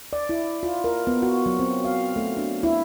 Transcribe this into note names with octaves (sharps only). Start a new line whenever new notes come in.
D5
E4
F4
A#4
B3
F#4
F#3
C4
F5
A3
D4
E4